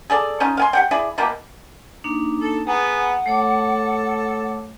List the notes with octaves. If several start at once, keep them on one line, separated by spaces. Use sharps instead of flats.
G#4 A4 D5
C#4 D#4 F4
F5 G#5 C6
G4 F#5 G5
E4 G#4 D5
B2 E3 A#3 G4
A#3 D4 D#4
A4
B3 G#4 F#5 A#5
A3 A4 C#5 D6